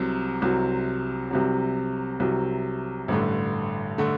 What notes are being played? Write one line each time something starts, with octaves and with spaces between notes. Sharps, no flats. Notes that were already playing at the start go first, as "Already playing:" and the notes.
Already playing: C2 C3 F#3
C2 C3 F#3
C2 C3 F#3
C2 C3 F#3
A1 G2 D3 A3
D3 A3